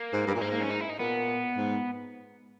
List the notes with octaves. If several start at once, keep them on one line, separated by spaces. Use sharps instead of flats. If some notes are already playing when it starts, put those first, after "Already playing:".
Already playing: A#3
G#2
G2
A#2
G#3
G#2 A#3
A#3
C#4
D#4
E4
D#4
A#2 B3
G#2